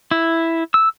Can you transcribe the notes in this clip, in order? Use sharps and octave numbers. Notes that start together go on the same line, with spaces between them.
E4
E6